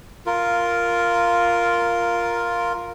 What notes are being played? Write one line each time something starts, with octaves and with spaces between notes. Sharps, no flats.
F4 A#4